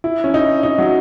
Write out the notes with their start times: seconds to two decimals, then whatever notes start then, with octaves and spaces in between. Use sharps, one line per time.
0.04 E4
0.24 C#4
0.34 D#4
0.63 D#4
0.78 F#3